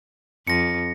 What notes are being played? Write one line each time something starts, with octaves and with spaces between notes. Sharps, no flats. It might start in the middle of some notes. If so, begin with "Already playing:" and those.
F2 A#6 C#7